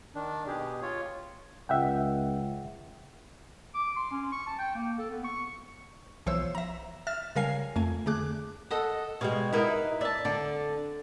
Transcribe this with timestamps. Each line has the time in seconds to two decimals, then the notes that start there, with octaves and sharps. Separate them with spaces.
0.15 D#3 D4
0.47 B2 G4 G#4
0.82 F4 C#5
1.69 C#2 E5 F#5 G5
3.74 D6
3.97 C6
4.11 C#4
4.32 C#6
4.47 A5
4.59 G5
4.75 A#3
4.98 A4
5.10 B3
5.24 C#6
6.26 B1 E3 F3 C5 C#5 E6
6.55 E5 A#5
7.07 E5 F6 A6
7.36 C#3 G3 A#4 F5 G#5 C7
7.76 F2 A3 G#5
8.06 D3 A3 G#4 D6 F#6
8.70 A4 D#5 F#5
9.21 B2 G3 G#3 C#5 F5
9.53 D#4 E4 F#4 A#4 B4
10.01 D5 E5 A5
10.25 D3 D5 A5